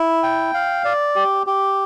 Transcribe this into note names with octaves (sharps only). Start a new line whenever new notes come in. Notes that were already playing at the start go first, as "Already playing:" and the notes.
Already playing: E4
G5
F5
D5
G4
G4